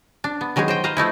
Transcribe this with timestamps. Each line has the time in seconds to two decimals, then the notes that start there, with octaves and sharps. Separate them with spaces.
0.24 D4
0.41 B3
0.56 D#3 F#3 G#3 D#4 G#4
0.68 C5 D#5 G5
0.84 B4 C5 D#5 F5 A#5
0.97 F3 A3 D#4 E4